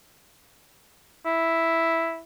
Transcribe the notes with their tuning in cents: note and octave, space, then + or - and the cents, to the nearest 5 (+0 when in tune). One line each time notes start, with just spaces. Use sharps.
E4 +0